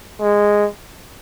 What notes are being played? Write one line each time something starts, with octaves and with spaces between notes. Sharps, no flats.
G#3